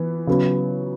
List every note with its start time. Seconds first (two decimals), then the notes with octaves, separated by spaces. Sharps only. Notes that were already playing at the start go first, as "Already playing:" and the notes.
Already playing: E3 B3
0.27 C#3 F#3 B3